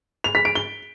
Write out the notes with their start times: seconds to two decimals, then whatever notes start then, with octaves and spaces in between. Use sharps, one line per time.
0.24 F7
0.35 B6
0.45 D7
0.55 G7